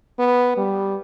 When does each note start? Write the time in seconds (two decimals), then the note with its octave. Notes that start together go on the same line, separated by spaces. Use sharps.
0.19 B3
0.57 G3